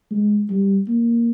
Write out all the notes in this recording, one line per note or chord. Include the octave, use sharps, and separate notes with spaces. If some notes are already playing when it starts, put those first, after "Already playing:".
G#3
G3
A#3